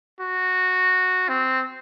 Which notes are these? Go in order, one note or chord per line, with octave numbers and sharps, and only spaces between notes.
F#4
C4